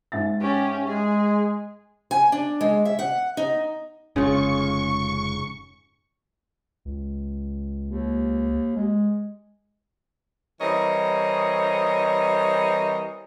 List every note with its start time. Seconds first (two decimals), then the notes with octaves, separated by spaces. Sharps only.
0.12 G#2 E5 A6
0.41 C#4 G4
0.87 G#3 G#4
2.11 G#5
2.32 D4
2.61 G#3
2.85 E5
2.99 F#5
3.37 D#4
4.16 F1 G#2 C#3 C#4 F4 C#6
6.85 C#2
7.88 D#2
8.76 G#3
10.61 E3 G3 C4 A#4 C#5 D#5